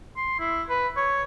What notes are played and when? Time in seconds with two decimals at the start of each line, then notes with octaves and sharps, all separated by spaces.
0.17 C6
0.40 E4
0.69 B4
0.97 C#5